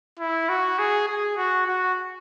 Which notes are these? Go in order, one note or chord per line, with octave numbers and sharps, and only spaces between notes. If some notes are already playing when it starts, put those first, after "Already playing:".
E4
F#4
G#4
G#4
F#4
F#4